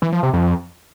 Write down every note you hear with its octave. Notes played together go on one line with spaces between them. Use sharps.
E3
F3
C3
F2